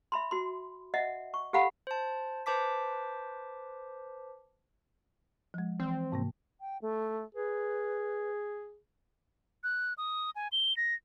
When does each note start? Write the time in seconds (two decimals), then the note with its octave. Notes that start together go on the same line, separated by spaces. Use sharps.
0.12 E5 B5 C6
0.31 F#4 C6
0.94 D#5 E5 F#5
1.34 C#6
1.53 G4 A4 F5 F#5 B5
1.87 C5 A5
2.46 B4 C5 A5 D6 B6
5.54 F3 G#3
5.80 E3 C4
6.12 G#2 C3 A#3
6.60 G5
6.82 A3
7.35 G#4 B4
9.64 F#6
9.98 D#6
10.36 G#5
10.52 G7
10.77 A#6